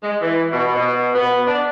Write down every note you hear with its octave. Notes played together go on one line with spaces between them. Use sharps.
G#3
E3
B2
B2
B3
D4